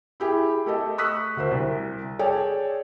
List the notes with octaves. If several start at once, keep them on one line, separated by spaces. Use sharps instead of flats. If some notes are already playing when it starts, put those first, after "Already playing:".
E4 G4 G#4
A3 G4 A4 D#5
C#6 D#6 E6 F#6 B6
D2 A#4 C5
C2
G#4 A4 C#5 D5 G5